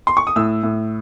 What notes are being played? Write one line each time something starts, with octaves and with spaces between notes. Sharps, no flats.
C6
C#6
D#6
A2 E6
A2